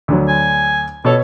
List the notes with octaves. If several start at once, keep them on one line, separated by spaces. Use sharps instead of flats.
D2 D3 F#3
G#5
B2 A4 C#5